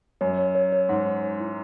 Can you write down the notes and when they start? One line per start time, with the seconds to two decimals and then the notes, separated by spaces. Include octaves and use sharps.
0.21 F#2 C#5
0.38 C#5
0.55 C#5
0.72 C#5
0.89 G#2 F#5
1.06 C#5
1.23 C#5
1.40 E4